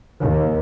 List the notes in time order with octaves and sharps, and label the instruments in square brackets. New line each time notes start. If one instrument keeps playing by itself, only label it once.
[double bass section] D#2